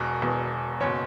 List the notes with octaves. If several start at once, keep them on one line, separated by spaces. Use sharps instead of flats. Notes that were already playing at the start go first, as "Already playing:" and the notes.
Already playing: E1 E2 B2 A#4
E1 E2 B2
F#1 B2 C#5